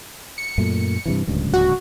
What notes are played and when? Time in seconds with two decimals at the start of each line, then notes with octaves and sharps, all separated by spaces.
0.38 C#7
0.58 F#2 A#2 A3
1.06 G2 C3 E3
1.27 D1 C#2 G2
1.54 F#4